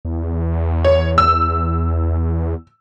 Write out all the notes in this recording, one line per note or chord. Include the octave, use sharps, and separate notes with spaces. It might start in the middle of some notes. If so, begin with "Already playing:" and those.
E2
C#5
E6